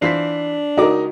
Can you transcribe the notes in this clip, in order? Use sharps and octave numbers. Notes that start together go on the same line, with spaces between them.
E3 D4 F4 C5 B6 C7
C#2 D#4 F#4 A#4 D6